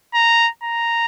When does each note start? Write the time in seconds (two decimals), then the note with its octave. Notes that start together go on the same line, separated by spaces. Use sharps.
0.14 A#5
0.63 A#5